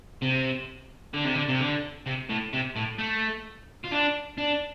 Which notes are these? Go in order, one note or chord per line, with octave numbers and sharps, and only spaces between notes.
C3
D3
C3
D3
C3
D3
C3
A2
C3
A2
A3
F4
D4
D4